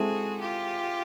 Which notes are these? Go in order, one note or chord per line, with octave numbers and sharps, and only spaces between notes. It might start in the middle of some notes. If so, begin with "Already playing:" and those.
Already playing: G#3 C4 E4 F#4 G#4 A4
F4 G4